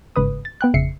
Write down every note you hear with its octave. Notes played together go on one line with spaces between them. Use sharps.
G1 G#2 C#3 B4 D#6
A6
B3 G5 F#6
G#1 F2 C#3 E5 C7 C#7